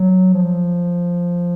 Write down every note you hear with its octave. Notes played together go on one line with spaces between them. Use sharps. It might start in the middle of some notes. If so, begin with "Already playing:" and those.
Already playing: F#3
F3